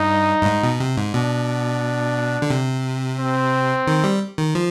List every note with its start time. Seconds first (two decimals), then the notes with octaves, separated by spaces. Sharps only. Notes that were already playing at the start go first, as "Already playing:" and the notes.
Already playing: G2 D#4
0.41 G2
0.46 G#2
0.63 B2
0.80 C3
0.97 G#2
1.14 B2 D4
2.42 D3
2.50 C3
3.19 C4
3.87 D#3
4.04 G3
4.38 D#3
4.55 F3